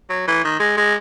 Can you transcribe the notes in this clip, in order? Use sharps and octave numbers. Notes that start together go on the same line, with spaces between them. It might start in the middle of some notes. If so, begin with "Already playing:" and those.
F#3
E3
D#3
G#3
G#3